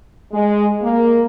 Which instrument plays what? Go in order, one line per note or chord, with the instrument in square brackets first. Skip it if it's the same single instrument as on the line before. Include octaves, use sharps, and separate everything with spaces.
[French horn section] G#3
A#3